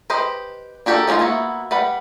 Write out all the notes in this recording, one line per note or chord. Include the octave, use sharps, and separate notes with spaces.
G4 B4 C5 D#5
D4 F#4 G4 A4 A#4
F3 G#3 C#4 D#4 F4
A#3 B3 E4 F#4
G3 B4 F#5 B5